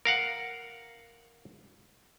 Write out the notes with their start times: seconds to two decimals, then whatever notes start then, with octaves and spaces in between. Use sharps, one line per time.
0.05 A#4 F5 F#5